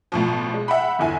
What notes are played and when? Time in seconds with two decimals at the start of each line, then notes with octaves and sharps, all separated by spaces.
0.12 A1 B2 F3
0.54 G#3
0.68 E5 F#5 G5 B5
0.99 G1 E2 E4 G#5